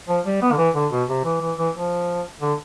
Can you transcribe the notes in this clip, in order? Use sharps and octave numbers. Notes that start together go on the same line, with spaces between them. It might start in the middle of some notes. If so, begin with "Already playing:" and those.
F3
G3
B3
D3
E3
D3
B2
C3
E3
E3
E3
F3
D3